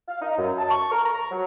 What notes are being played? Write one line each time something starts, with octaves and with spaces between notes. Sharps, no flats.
F5
D#4
F#2
A5
C#6
A#4
A#5
F#3